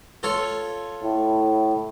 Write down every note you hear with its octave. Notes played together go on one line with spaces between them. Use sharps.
F4 A4 C#5
A2